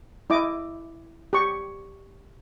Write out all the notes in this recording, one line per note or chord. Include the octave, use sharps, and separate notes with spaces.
E4 D#5 D6
G4 C#6